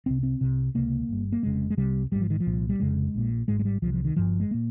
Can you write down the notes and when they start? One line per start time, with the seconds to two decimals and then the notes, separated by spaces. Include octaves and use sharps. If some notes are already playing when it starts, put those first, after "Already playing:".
0.06 C2 C3 C4
0.23 C4
0.41 C2 C3
0.75 C#2 C3 A#3
1.09 G1 G2
1.32 A#3
1.43 F1 F2 C#3 G#3
1.70 G#3
1.77 C2 C3 G3
2.11 G#1 G#2 G3
2.21 F3
2.30 D#3
2.40 F3
2.46 C2 A#2
2.69 G3
2.80 F1 F2 C#3 G#3
3.14 A#1 A#2
3.48 G#1 G#2 G#3
3.59 G#3
3.65 G3
3.82 C2 F3
3.86 C3
3.94 F3
4.05 D#3
4.16 G1 G2 F3
4.40 G#3
4.51 A#2 A#3